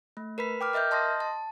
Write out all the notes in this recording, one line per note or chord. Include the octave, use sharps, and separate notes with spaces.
A3
A#4 B4 B5 B6
G5 D6 F6
A#4 D#5 E5 F6 G6
D#5 A5 C6 D#6 A#6
A5